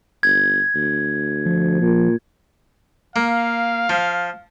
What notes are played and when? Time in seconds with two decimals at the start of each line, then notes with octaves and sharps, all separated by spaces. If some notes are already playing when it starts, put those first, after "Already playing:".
0.23 G1 G#6
0.75 D2
1.46 F3
1.81 A#2
3.16 A#3 F5
3.89 F3